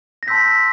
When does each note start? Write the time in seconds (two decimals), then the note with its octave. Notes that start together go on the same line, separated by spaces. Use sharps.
0.23 A#6
0.28 A5 C6 E6 G6 B6